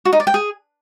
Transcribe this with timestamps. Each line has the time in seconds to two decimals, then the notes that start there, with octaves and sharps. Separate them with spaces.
0.05 F#4
0.13 D#4
0.20 D5
0.27 G5
0.34 G#4